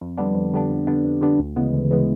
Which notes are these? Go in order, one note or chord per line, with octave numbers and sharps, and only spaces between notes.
F2
D3 G3 B3 D4
F2
D3 G3 B3 D4
F2
D3 G3 B3 D4
F2
D3 G3 B3 D4
D2
C#3 E3 G#3 B3
D2
C#3 E3 G#3 B3